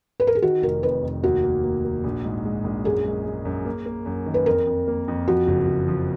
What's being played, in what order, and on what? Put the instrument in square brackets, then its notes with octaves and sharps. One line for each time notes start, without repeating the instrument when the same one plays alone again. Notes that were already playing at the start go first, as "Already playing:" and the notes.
[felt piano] B4
A#4
G#4
[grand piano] D#3 [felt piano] F#4
[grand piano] F1 [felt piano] A#4
[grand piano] F2 [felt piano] B4
[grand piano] F1
[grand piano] D#2 [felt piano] F#4
[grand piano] A#3
A#3
A#3
A#1
G#2
G#3
A#1
[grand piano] F#2 [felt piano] G#4
[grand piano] G#3
G#3
F#2
A#3
A#3
F#2
D#3
[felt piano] B4
[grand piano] F2 [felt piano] A#4
[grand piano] F2
A#3
F2
[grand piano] F3 [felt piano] F#4
[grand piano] F#1
F#1
F3